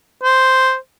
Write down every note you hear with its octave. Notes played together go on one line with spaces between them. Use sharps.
C5